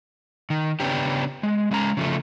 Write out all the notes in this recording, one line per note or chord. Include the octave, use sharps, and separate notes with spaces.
D#3
C#3 B3 C#4 D4 G4
G#3
G#3 C#4 A#5
C#3 F3 A3